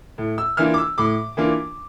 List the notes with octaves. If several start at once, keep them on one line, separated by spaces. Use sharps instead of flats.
A2
E6
E3 A#3 D4 F4 F6
D6
E6
A2 D6
E3 A#3 D4 F4